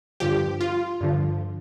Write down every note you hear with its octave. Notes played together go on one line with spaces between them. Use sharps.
G2 D3 F3 G4
F4
G2 D3 F3